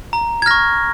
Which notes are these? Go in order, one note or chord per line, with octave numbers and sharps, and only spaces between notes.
A#5
G#6
C#6 F6 A#6